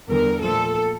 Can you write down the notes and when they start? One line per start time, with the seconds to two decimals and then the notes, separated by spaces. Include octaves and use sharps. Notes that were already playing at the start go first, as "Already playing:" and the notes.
0.09 E2 D3 G3 A#4
0.41 A#2 F3 A3 A4